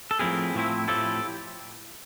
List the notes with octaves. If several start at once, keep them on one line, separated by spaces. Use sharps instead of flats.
A4
A2 F3 A3 C4 E4 G#4 A#4
A2 F3 A3 C4 E4
A2 F3 A3 C4 E4 G4 A4